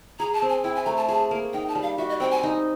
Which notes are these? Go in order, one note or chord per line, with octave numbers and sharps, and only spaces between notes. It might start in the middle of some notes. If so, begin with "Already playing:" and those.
G#4 A#5
A5
C4
G#5
E4 G5
G#5
A3 A#5
A5
G#4 A5
A#3
D#4 G5
A5
G3
F5
F#4 E5
D#5
C4 G5
G#5
D#4